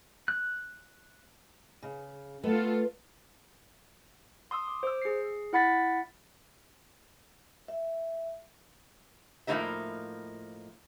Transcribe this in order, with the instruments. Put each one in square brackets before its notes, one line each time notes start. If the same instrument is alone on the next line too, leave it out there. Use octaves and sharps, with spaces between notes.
[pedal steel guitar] F#6
[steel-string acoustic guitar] C#3
[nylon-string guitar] A3 [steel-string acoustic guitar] B3 [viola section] F4 A4
[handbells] C6 D#6 E6
D6
C5 E6
G#4 C7
E4 F#5 B5 A6 B6
[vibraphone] E5
[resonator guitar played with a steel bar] A2 F3 A3 A#3 D#4 E5